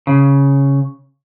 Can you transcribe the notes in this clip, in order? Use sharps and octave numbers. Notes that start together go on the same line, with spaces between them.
C#3